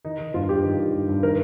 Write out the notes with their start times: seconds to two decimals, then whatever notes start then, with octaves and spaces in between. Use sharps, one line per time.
0.05 D#3 D#4
0.19 D#3
0.34 G2 F4
0.49 G2 G4
0.64 D#3
0.78 D#3
0.93 G2
1.09 G2
1.23 D#3 A#4